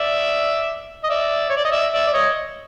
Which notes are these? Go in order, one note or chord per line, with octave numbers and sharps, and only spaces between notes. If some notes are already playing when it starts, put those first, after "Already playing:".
Already playing: D5 E5
D#5
D5 E5
C#5
D5
D#5
D5 E5
D5 E5
D5
C#5 D#5